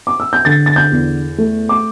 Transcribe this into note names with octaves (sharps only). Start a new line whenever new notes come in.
D6
E6
G6
D3 A6
A6
G6
E2
A3
D6